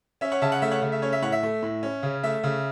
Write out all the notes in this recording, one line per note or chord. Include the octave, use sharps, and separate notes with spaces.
C#4 E5
C#5 F#5
C#3 E5 A5
C#5 F#5
A3 E5
C#5 F#5
C#3
E5
C#4 C#5
E5
A2 C#5 F#5
E5
A3
A2
C#4
C#3
A3 E5
C#3